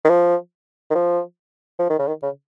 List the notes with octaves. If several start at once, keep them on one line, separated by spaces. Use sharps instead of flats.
D#3
F3
D#3
F3
F3
D#3
C#3
D#3
C#3